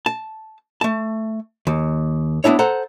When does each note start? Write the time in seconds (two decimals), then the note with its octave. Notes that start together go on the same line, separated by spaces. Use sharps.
0.06 A5
0.81 A3 A5
1.67 D#2
2.44 B3 D4 E4 C#5
2.59 A4 C5 F#5 A#5